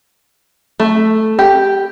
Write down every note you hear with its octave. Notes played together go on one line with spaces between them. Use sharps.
A3
G4